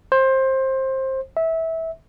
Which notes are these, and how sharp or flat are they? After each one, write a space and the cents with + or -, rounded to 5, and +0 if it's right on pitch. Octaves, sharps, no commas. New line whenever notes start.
C5 +20
E5 -20